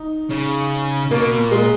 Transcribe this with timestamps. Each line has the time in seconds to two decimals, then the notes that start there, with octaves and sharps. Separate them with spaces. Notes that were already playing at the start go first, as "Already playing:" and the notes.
Already playing: D#4
0.30 C#3
1.10 B2 A#3
1.38 A#2
1.51 G#3